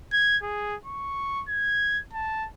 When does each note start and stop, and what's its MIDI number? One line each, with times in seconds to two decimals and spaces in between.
0.13 0.37 92
0.43 0.76 68
0.86 1.44 85
1.49 2.00 92
2.13 2.47 81